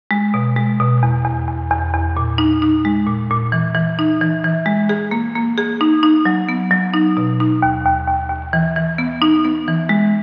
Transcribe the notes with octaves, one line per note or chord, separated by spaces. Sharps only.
G#3
B2
G#3
B2
E2
E2
E2
E2
E2
A#2
D#4
D#4
G#3
A#2
A#2
E3
E3
D#4
E3
E3
G#3
G#4
A#3
A#3
G#4
D#4
D#4
F#3
B3
F#3
D#4
B2
D#4
D#2
D#2
D#2
D#2
E3
E3
B3
D#4
B3
E3
G#3